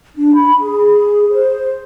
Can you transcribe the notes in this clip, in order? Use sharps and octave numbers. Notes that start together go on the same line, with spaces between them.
D4
B5
G#4
C5